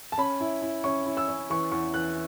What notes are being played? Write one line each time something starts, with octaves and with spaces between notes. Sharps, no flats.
A5
C#4 B5
E4
E4
C#4 C#6
E4
E6
C#4
E3 C#6
E2 C#6
E3 F#6